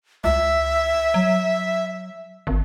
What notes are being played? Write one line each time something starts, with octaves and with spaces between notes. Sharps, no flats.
C#2 E5
F#3
G#1